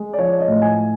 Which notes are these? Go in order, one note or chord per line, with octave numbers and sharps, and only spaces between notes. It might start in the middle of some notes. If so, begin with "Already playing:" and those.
Already playing: G#3
D5
F3 C#5
D#5
A2
G#5